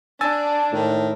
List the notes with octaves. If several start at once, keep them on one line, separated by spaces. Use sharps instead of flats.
D4 G#5 E6 A6
A2 D#3